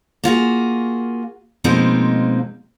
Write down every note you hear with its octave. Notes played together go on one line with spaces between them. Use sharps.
A#3 F4 F#4 G#4
B2 F3 G#3 A#3 C4 D#4